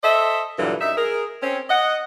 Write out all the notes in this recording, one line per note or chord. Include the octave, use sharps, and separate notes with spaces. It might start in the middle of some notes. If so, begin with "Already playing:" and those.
A4 C5 D#5 E5
G2 A#2 D3 E3 F#3
F#2 D#4 E5
G#4 A#4
C4 C#4
D#5 F#5